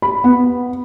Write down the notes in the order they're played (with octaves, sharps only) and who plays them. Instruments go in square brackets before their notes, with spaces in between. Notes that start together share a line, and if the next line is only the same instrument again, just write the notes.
[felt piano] B5
B3